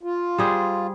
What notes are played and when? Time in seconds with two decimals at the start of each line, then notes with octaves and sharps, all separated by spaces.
0.03 F4
0.38 G3 G#4 C5